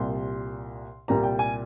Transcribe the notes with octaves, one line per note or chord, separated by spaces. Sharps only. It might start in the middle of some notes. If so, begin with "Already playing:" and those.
Already playing: C2 A#2 G3 C6
C2 A#2 G3 A#5
G5
G#5